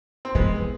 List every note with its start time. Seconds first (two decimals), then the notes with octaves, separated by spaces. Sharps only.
0.25 C4
0.35 E3 G#3 B3